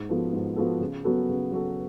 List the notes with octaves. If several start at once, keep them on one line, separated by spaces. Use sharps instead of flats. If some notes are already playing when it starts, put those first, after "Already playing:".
Already playing: G#2
F3 B3 F#4 A4
G#2
F3 B3 F#4 A4
C#3
F#3 B3 F#4 A4
C#3
F#3 B3 F#4 A4